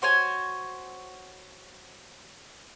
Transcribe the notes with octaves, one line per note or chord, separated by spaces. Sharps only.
F#4 C5 C#5 G#5